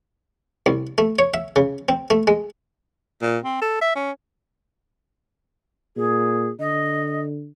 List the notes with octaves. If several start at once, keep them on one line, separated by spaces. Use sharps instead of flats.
C2
A3
C#5
E5
C#3
C4
A3
G#3
A#2
C4
A4
E5
C#4
A#2 G#4
D3 D#5